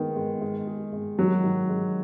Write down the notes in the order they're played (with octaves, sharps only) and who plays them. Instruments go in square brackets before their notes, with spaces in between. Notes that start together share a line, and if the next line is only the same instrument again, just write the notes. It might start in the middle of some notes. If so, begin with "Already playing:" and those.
Already playing: [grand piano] D#3 [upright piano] G#3 B3
[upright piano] G#3
G#3
G#4
G#3
[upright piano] D#3 [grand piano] F#3
[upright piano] D#3
G#3